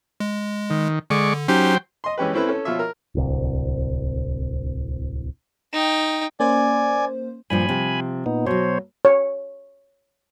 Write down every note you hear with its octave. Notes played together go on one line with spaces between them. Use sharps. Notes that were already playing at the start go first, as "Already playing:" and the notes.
G#3
D#3
D3 G#3 D5 C#6
F#3 C#4 D#4 G4 C5 G5
D#5 C6
E3 G#3 C#4 G4 B4
C4 C#4 E4 A4 B4
C#4 A4
B2 F3 F4 C#5 E5
A#4
D1 C2
D#4 G5
A#3 C#4 C5 D5 G#5
G2 A#2 F3 G#5 B5
C3 F3
A#2 B3 D#4
B2 F#3 C5 C#5
C#5